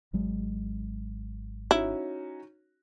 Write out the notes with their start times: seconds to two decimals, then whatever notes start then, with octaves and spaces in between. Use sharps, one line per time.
0.13 G#1 F#3 G#3
1.71 C#4 D#4 E4 F#4